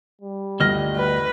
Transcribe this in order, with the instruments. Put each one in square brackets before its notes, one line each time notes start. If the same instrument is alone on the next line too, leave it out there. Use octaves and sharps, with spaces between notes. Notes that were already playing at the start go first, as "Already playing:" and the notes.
[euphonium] G3
[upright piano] G1 F6 A#6 [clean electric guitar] D2 D#5
[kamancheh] B4